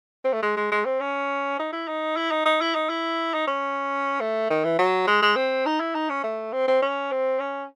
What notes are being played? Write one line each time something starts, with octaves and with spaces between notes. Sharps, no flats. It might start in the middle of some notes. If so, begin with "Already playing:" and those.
C4
A3
G#3
G#3
G#3
C4
C#4
D#4
E4
D#4
E4
D#4
D#4
E4
D#4
E4
D#4
C#4
A3
D#3
E3
F#3
G#3
G#3
C4
D#4
E4
D#4
C#4
A3
C4
C4
C#4
C4
C#4